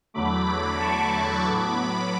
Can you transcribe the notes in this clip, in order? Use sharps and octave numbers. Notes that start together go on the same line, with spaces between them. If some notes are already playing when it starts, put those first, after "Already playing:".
E2 D3 F#3 A3 B5 D6
A5 C#6
A2 F#3 B3 B5 D6